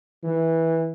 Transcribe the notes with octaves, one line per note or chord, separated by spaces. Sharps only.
E3